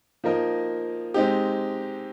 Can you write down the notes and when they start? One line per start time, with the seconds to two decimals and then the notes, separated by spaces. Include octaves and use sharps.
0.24 F3 A#3 D#4 A#4 D#5
1.14 G#3 C4 D#4 G4